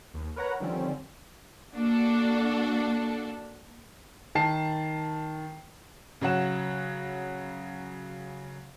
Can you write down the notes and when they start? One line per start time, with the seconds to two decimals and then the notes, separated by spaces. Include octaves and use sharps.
0.14 D#2
0.36 A#4 B4 C#5 F#5 A#5
0.60 D3 D#3 F3 G3 C4 C#4
1.74 A#3 D4 F#4 A4
4.35 D#3 A5 C7
6.21 C#3 F#3 C#5 F#5 E7